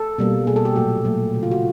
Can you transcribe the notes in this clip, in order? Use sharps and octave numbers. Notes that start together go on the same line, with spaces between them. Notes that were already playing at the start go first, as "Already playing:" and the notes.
Already playing: A4
B2 G3 A#3
B2 G3 A#3 G#4
A4
G4
A#2 F#3 A3 F#4
A#2 F#3 A3
C#3 F#3 A3
F4
F#4